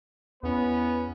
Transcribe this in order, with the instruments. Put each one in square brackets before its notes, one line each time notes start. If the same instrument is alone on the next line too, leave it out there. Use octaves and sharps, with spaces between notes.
[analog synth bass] E2 [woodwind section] B3 [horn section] C#4 E4 B4